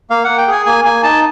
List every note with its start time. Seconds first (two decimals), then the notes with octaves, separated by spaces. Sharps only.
0.10 A#3 F5
0.24 A#3 F#5
0.38 G5
0.47 G#4 G#5
0.66 A#3 G#5
0.84 A#3 G#5
1.03 D#4 A5